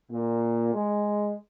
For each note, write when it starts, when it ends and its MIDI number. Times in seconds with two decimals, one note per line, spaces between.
0.10 0.71 46
0.74 1.32 56